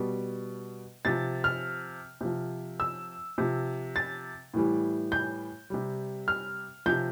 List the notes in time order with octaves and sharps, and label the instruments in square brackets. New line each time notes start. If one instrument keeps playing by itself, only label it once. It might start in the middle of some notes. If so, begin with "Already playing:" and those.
Already playing: [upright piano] B2 G3
C3 F3 A6
F6
C3 F3
E6
C3 F3
A6
A2 E3 G3
G6
C3 G3
F6
C3 F3 G6